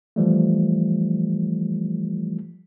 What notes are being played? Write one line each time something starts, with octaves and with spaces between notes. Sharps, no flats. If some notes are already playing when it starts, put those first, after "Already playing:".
E3 F3 G3 A3